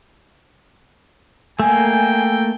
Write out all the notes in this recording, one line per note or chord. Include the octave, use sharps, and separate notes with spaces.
A3 A#3 G5 G#5